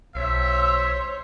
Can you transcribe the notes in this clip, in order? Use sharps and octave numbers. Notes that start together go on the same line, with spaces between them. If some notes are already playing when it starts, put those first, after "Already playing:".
B1 C5 C#5 E5 C6 E6